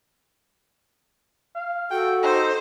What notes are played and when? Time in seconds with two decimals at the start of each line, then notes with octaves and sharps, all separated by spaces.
1.55 F5
1.91 F#4 A4 G5
2.23 D#4 C5